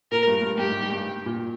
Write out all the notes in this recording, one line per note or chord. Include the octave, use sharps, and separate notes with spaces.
A#2 A#4
G2
G2
G2 G4
G#2
G2
G2
A#2